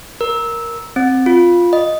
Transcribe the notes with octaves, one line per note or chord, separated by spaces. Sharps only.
A#4
C4
F4
D#5